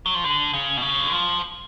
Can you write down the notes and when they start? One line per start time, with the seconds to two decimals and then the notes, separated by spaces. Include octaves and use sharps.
0.06 F#3
0.14 F3
0.24 D3
0.53 C#3
0.77 B2
0.82 C#3
0.99 D3
1.12 F3